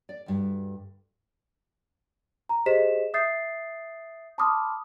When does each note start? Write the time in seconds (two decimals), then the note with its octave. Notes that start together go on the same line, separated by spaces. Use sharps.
0.09 D5
0.26 D2 G2
2.49 A#5
2.66 G4 G#4 C5 D#5 B6 E7
3.14 E5 D#6 G6 A6 C7
4.38 A5 B5 C6 D6 D#6 F6